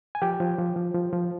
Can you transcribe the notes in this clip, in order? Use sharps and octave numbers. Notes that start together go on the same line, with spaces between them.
G#5
F3 G4 G5
F3
F3
F3
F3
F3